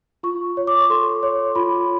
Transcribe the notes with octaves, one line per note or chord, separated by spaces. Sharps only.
F4 C#6
C#5
D6
C#6
A4 C6
C#5
F4 B5